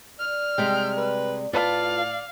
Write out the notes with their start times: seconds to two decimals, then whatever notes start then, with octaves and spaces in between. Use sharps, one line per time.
0.19 D5 F6
0.58 C3 G3 G#3 G5
0.97 B4
1.53 A2 F4 B4 D5 F5 A5